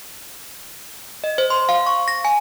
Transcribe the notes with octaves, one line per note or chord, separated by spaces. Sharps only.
D#5
C5
C6
F5
C#6
A#6
G#5